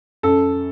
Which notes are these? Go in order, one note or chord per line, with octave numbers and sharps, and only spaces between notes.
F#2 A4